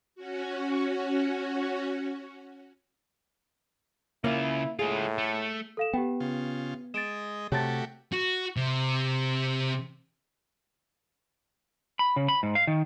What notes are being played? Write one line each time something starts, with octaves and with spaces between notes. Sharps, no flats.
C#4 F#4
C#3 A#3 E4 F4
A2 G#3 F4 G#4
A3
A4 F5 E7
B3 G4 G5
C#3 F4
G#3 D#5 A6 D7 E7
C3 A3 F#4 G4 C#5 A5 A6
F#4
C3
B5
C#3
B5
G#2
F5
D#3